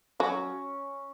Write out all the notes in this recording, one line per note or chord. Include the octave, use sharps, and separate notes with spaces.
F#3 C#4